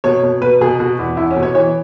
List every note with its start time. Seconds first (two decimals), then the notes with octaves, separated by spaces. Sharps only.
0.04 B2 C#5
0.23 B2
0.41 B2 B4
0.61 B2 G#4
0.80 B2 F#4
0.99 E2
1.17 E2 E4
1.31 C#4
1.36 B2
1.43 C#5
1.55 E3 C#5